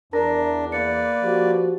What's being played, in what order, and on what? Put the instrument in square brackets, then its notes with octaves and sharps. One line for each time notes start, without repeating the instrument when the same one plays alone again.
[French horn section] E2 [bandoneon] D4 [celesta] A#4 A#5 A#6
[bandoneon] A#3 B4 D5 [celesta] C#7
[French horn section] F3 F#4 [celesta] G4